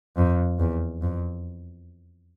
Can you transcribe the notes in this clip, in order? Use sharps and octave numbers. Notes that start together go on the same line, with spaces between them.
F2
E2
F2